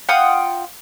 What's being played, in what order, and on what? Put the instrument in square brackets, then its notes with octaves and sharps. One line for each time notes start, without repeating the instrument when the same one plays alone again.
[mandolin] F4 F#5 G5 D#6